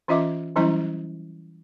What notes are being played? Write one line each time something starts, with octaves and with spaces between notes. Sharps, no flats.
E3 C#4 F4 D#5 E5 D6
E3 F#3 G3 C#4 E4 A#5